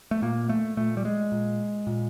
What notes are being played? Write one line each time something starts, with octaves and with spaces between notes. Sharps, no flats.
A3
A#2 A#3
A3
A#2 A3
G3
G#3
A#2
A#2